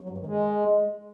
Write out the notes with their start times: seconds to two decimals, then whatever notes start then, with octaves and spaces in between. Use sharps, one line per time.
0.01 F#3
0.09 G2
0.18 D#3
0.26 G#3